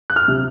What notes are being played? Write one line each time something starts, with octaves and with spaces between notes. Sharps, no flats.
F#6
F6
C3